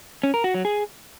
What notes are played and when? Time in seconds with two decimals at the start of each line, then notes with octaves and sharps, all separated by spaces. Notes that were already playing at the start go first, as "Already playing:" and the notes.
0.23 C#4
0.34 A#4
0.44 F#4
0.54 F#3
0.65 G#4